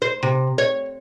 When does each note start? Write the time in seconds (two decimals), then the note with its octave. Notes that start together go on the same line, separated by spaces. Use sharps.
0.02 C5
0.23 C3
0.58 C#5